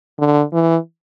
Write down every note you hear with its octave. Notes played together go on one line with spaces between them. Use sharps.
D3
E3